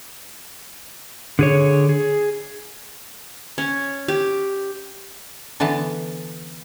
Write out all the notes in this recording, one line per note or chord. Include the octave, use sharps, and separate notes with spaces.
D3 G#4 C#5
G#4
C#4
G4
D3 E3 B3 B4 A5